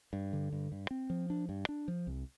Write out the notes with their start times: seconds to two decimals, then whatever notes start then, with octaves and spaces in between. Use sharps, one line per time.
0.13 G2
0.33 D3
0.53 G2
0.72 G2
0.91 C4
1.10 F3
1.30 D4
1.49 G2
1.69 D4
1.88 F3
2.07 C2